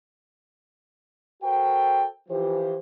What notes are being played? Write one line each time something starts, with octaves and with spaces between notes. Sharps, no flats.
F#4 A4 A#4 C5 G5
E3 F3 G4 C5